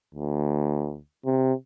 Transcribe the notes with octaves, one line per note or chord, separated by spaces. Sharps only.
D2
C3